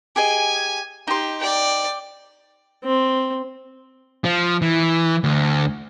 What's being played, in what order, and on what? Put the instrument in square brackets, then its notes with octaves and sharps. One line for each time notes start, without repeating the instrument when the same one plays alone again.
[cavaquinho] G4 G#4 D#5 [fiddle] G#5
[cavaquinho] D#4 C6 [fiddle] G4
[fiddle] D5 G5
[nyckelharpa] C4
[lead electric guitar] F3
E3
D2